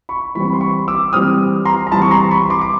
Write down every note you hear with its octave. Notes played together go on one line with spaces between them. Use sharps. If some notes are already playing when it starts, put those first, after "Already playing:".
B5 C#6
E3 G3 C4 B5 C#6
B5
C6
B5 C#6
D6 E6
E3 G3 C4 D#6 F6
A#5 C6
A#5
E3 G3 C4 A5 B5
C#6
A#5 C6
B5 C#6
C6 D6
D6